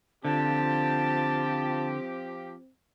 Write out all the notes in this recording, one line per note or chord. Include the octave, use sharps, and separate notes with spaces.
D3 F3 C4 G4 A5